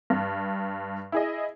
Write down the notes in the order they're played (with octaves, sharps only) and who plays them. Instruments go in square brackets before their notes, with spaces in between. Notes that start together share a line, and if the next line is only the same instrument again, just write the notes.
[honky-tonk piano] G2
E4 G#4 D#5